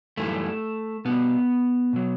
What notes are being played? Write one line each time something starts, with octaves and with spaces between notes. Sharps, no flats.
F#2 E3 G3 A3
B2 G3 B3
B2 F#3